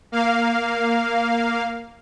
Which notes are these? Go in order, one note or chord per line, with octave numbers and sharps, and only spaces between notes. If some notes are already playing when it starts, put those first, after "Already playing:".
A#3 F5